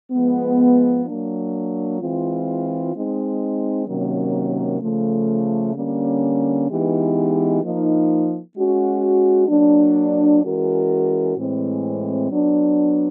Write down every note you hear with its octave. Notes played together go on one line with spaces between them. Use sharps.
F3 G#3 B3
F#3 A#3 D4
E3 G#3 C4 F4
G#3 C4 D#4
C3 D#3 F#3 A#3 C#4
C#3 F3 A3
D3 G3 A#3 C#4
E3 G#3 B3 D#4 G4
F3 A#3 D#4
G#3 C#4 F#4
F#3 A#3 D4
E3 G#3 C#4 F#4 A#4
A2 E3 G#3 C4
F#3 B3 D4